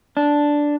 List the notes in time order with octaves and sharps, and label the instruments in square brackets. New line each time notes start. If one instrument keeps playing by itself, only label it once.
[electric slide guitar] D4